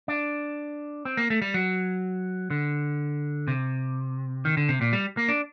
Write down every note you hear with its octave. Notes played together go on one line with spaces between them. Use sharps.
D4
C4
A#3
A3
G3
F#3
D3
C3
D#3
D3
C3
A#2
G3
A#3
D4